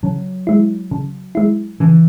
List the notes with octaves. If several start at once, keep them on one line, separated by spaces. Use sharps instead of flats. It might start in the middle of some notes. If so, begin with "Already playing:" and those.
C#3 F#3
G#3 E4
C#3
G#3 E4
C#3 E3